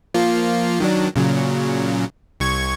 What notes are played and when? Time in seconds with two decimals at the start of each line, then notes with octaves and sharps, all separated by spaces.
0.14 F3 A#3 F4
0.80 D#3 F#3 D4
1.15 A#2 C#3 F#3
2.40 C2 C#6 G#6